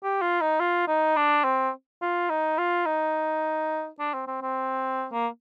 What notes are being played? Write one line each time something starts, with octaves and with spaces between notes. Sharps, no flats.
G4
F4
D#4
F4
D#4
D4
C4
F4
D#4
F4
D#4
D4
C4
C4
C4
A#3